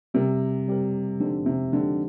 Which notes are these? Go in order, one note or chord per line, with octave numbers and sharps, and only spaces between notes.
C3 G3 C4 G4 A#4
G3 C4 G4 A#4
D3 F3 G#3 C4 D#4 G4
C3
D3 F3 G#3 C4 D#4 G4